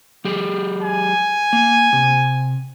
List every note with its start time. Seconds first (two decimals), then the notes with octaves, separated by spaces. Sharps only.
0.25 F#3 G4 G#4
0.82 G#5
1.53 A#3
1.93 C3